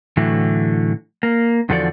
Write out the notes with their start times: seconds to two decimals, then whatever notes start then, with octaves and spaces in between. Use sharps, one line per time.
0.17 A2 D3 E3 F#3 A3
1.23 A#3
1.69 E2 D3 F3 F#4 A4 D5